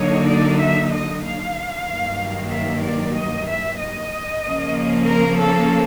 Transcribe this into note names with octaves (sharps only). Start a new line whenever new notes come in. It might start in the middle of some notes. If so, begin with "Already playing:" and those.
Already playing: D3 F#3 A#3 D#4 C#5
D5
E5
D#5
F5
G2 D#3 F#3 A#3
E5
D5
D#5
E5
D#5
C#3 F3 A#3 C#4
A#4
A4